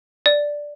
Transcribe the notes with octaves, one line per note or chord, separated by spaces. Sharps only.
D5